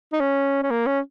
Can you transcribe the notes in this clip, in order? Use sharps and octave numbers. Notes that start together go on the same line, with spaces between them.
D#4
C#4
C#4
A#3
C#4